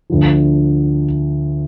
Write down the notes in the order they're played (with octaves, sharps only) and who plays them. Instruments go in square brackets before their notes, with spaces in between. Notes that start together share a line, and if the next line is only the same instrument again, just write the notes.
[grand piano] D2 D3 F3